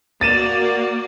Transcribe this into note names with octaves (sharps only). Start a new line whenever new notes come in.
A#3 F#4 D5 A6 D#7 E7